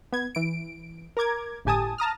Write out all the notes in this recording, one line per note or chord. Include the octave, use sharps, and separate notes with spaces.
B3 G#6
E3 D7
A#4 A#5 D6 G#6
G1 A2 G4 G#5 A5 D#6
A5 A#5 D#6 F6